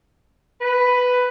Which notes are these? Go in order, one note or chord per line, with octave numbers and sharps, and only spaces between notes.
B4